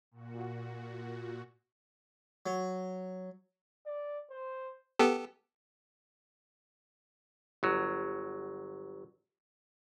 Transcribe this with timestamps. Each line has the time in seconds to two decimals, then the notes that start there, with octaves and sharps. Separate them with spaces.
0.11 A#2 F#4
2.46 F#3
3.86 D5
4.31 C5
4.99 B3 G4 A4
7.63 G1 F#3